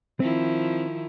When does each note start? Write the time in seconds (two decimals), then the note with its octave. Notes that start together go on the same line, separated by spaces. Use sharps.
0.20 D#3 F3 C4 E4